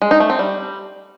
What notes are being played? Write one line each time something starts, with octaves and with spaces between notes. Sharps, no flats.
G#3
D#4
A3
C4
G3